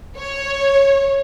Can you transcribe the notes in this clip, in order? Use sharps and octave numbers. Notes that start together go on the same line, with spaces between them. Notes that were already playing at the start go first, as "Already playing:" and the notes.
C#5